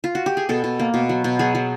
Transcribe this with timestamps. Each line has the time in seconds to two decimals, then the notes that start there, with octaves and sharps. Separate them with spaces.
0.04 F4
0.15 F#4
0.26 G4
0.37 G#4
0.49 B2 A4
0.64 B2
0.79 A#3
0.94 B2
1.09 F#3
1.24 B2
1.39 F#3 G#4
1.55 F#3